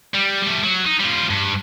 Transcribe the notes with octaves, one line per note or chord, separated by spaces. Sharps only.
G3
G3 A3
F#3
D#4
G3 F4
G2